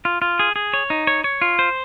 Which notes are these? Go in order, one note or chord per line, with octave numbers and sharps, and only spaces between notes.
F4
F4
G#4
G#4
C#5
D#4
C#5
C#5
F4
C5